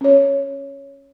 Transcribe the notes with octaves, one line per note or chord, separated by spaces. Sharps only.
C#4 F#4 C#5